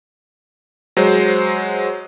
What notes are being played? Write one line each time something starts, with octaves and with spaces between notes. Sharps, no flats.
F#3 G#3 C5